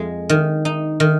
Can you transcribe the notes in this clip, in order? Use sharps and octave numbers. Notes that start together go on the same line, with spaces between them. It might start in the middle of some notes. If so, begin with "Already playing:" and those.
Already playing: F2 G#3
D#3
D#4
D#3